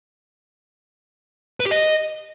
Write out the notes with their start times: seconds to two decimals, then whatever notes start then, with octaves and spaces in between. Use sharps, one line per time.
1.60 B4
1.66 G4
1.71 D#5